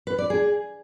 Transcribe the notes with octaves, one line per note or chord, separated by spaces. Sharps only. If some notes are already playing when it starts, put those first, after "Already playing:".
B4
D5
G#4